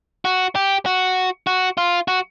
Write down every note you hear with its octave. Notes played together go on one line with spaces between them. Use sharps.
F#4
G4
F#4
F#4
F4
F#4